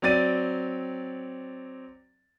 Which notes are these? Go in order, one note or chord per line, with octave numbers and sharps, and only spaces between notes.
F#3 C4 D5 A6 D#7